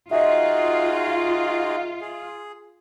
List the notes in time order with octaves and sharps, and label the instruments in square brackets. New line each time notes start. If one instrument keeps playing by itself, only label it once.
[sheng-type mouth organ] D#4 F#4 G#4 [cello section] F4 [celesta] D#5 E5
[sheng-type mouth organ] G#4